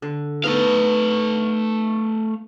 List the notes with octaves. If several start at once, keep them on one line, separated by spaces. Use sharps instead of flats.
D3
A3 B3 D#4 A4 F5